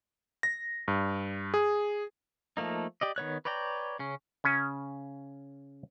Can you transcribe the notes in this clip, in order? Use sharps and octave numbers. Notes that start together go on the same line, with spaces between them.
A#6
G2
G#4
F3 A3 A#3 D#4
G4 D5 D#5
D#3 B3 C#5 F#6
B4 C#5 D5 G5 A#5
C#3 C#4
C#3 C#4